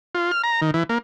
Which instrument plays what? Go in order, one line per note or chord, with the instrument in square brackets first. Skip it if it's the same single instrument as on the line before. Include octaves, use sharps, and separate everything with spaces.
[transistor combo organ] F4
F6
A#5
D#3
E3
A#3